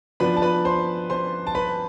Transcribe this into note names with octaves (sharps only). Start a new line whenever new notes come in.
F3 B3 D4 B4 B5
A5
B4 B5
C5 C6
C5 C6
A5
B4 B5